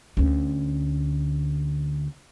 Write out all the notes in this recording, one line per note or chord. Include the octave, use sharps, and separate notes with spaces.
D2 C#4